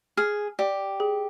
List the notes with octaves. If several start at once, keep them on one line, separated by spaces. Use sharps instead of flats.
G#4 F6
G4 D5
G#4